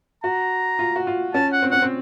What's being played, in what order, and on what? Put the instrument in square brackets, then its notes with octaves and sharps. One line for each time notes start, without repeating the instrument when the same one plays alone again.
[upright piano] F#4 [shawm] A#5
[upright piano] F4
F#4
F4
[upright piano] C#4 [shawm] A5
[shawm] F#5
[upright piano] C4
[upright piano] C#4 [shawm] F#5
[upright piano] C4